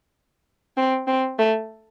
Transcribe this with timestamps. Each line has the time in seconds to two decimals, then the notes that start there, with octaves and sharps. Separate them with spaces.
0.77 C4
1.07 C4
1.39 A3